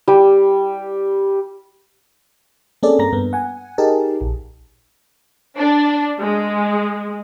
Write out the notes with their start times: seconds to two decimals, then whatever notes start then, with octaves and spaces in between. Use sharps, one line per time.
0.08 G3
2.83 A#3 C4 C#4 G#4 A4 D5
2.99 G2 A#3 A#5 A#6
3.12 G2 B3
3.33 F#5 G#5
3.78 D#4 G4 G#4 A#4 A5
4.21 A#1
5.58 D4
6.20 G#3